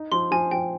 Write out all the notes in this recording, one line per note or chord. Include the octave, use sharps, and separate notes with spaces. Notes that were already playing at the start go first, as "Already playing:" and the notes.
Already playing: D#4
F3 C6
F3 G#5
F3 G5